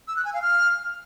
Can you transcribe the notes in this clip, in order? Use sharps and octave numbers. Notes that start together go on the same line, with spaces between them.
E6
F#6
G#5
F5
F6